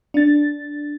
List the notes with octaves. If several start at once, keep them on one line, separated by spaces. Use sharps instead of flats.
D4 A6